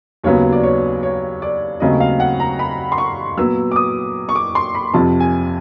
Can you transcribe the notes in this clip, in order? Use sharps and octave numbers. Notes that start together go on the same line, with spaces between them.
D#2 C#3 F#3 B3 C#5
D5
C#5
C#5
D5
D#2 C#3 F#3 A3 C4 D#5
F5
F#5
A#5
B5
C6
C#6
A#2 F#3 B3 E6
D6
D#6
C#6
D6
C6
B5
F2 C3 F3 A5
G#5